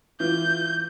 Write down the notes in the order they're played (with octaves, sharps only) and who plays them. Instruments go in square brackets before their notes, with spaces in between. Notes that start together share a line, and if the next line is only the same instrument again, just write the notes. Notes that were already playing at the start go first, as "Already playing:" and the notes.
[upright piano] E3 F4 [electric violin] G6